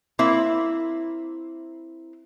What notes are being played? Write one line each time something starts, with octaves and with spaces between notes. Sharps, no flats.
A#3 C4 E4